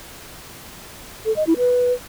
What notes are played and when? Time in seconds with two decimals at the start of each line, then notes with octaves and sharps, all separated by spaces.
1.26 A4
1.36 D#5
1.47 E4
1.58 B4